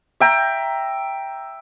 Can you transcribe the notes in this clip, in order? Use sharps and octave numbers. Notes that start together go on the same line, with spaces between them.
E5 G5 A#5